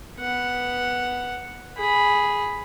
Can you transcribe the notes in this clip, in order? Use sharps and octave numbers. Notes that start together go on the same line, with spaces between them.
B3 F#5
G#4 B5